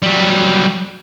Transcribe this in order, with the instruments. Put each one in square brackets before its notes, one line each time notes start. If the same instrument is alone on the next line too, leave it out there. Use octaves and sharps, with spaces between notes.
[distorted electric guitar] F#3 G3